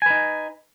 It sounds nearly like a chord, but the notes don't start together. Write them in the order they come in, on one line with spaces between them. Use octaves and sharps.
G#5 B4 D#4